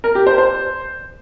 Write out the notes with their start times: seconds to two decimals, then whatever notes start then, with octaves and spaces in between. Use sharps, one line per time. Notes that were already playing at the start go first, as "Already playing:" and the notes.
0.04 A#4
0.15 G4
0.27 C5
0.38 C5